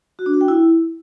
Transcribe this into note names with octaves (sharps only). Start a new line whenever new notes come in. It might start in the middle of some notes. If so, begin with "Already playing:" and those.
F#4
D4
F#4
G5
E4